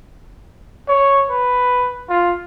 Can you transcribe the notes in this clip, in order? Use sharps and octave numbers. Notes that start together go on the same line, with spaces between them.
C#5
B4
F4